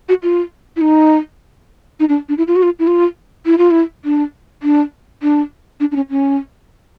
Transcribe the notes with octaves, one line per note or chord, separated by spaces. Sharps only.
F#4
F4
E4
D#4
D#4
D4
D4
E4
F4
F#4
F4
E4
F4
E4
F4
E4
D4
D4
D4
D4
D4
C#4
C#4